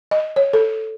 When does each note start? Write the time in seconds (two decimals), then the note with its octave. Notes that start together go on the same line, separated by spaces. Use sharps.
0.11 D#5
0.36 C#5
0.53 A4